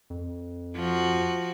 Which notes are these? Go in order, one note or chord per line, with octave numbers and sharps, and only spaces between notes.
F2
F3 F#4